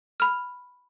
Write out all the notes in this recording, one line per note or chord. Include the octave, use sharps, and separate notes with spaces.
B5 F6